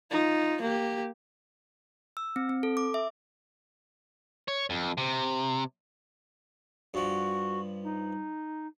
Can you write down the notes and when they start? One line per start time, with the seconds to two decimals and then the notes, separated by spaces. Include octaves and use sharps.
0.11 D#4 F4
0.61 A#3 G4
2.17 E6
2.36 C4
2.49 C4
2.63 A4
2.77 D6
2.94 E5
4.48 C#5
4.70 F2
4.98 C3
6.94 G2 F3 F#4
7.83 D#4